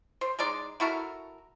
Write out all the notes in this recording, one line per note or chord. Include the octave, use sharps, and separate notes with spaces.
C5
G#3 D#4 D5 C6
E4 F#4 A4 A#4